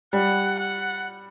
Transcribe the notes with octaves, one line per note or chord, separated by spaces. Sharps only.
G3 F#5
F#5